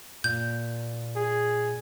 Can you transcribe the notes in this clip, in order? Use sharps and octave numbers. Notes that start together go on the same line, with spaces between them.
A#2 G6
G#4